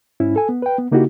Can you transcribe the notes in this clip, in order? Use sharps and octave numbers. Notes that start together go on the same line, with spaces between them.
G#2 C#4 E4
A4 G#5
B3
B4 G5
B3
C#3 A#3 D#4 E4 F#4 G4